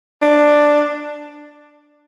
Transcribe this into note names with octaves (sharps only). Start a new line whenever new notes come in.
D4